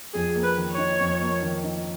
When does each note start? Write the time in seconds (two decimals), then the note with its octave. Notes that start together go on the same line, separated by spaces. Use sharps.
0.14 F2 G#4
0.36 A#3
0.43 B4
0.57 D#3
0.71 C#5
0.78 D#4
1.00 F2
1.22 A#3
1.42 D#3
1.64 D#4